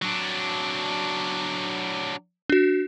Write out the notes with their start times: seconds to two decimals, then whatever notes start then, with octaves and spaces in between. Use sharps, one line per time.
0.02 F#3 D4
2.50 D4 F#4